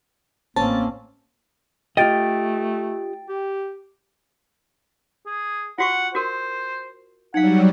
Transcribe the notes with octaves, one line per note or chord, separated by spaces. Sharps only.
A1 A#3 C4 C#4 A5
A3 F4 G4 D#5 G5 A6 D7
G4
G#4
F4 F#4 F#5 C#6
F#4 A#4 C5
F#3 G3 D#4 F5 F#5